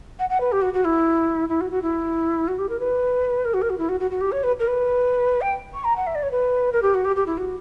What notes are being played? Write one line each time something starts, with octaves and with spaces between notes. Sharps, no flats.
F#5
F#5
B4
G4
F#4
F#4
E4
E4
F#4
F#4
E4
F#4
G4
A#4
B4
A#4
F#4
A#4
F#4
E4
F#4
F#4
F#4
G4
C#5
B4
A#4
B4
G5
C#6
A#5
F#5
E5
D5
C#5
B4
A#4
G4
F#4
G4
G4
E4
F#4